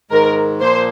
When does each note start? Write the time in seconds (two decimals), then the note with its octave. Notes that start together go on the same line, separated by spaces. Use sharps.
0.10 G#2 D#3 G#3 A#4
0.61 A#2 F3 A#3 C5